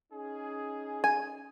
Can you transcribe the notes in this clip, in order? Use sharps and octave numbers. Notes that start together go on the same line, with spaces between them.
C#4 D#4 G#4
G#5